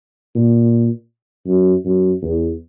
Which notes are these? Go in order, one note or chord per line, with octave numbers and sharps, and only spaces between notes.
A#2
F#2
F#2
E2